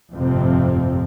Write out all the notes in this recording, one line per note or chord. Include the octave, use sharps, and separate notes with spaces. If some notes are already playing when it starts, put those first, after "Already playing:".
G1 F2 A2 C3 F3 C4